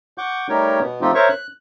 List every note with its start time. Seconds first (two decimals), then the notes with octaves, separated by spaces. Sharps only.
0.18 F#5 C#6 D6 G6
0.49 G3 A3 D#4 G4 A#4 C#5
0.80 B2 B3
1.01 F3 A3 C4 D#4 F4 G4
1.15 A#4 C5 C#5 E5 C#6
1.29 F#6